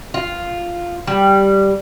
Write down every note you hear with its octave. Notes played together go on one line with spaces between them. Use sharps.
F4
G3